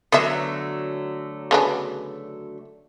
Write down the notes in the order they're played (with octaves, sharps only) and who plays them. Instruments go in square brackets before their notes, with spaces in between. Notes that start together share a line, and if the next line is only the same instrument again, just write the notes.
[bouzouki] D3 F#3 A3 [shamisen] B3 E5
[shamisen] C#3 B3 D4